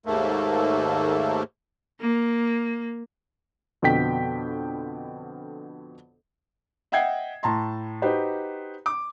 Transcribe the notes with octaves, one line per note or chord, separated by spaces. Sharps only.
D#2 G#2 A3 A#3
A#3
F2 B2 D3 G5 B6
D#5 E5 F#5 G5 G#6 C7
A2 A5 A#5 C6
D#4 F#4 G4 B4 C5
D6